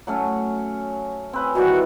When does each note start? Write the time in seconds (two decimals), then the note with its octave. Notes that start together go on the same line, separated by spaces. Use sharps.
0.07 F#3 A3 C#4
1.33 C4 B4 G#5
1.55 D#3 E3 G3 F#4